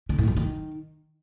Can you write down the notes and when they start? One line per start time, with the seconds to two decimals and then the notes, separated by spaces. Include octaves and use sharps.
0.09 D3
0.18 A2
0.28 F#2
0.37 D#3